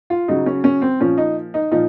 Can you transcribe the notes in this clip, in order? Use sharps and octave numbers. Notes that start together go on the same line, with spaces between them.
F4
C#3 F#3 D#4
C#4
C#4
C4
A#2 F3 C#4
D#4
D#4
A#2 F3 D#4